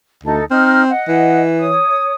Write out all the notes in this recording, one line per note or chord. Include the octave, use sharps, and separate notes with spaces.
D2 D#4 A4
C4 D#4 F6
D#5 F#5
E3
C#5 D#6